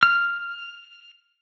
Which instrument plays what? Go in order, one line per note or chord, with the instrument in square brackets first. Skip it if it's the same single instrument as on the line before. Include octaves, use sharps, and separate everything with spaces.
[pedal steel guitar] F6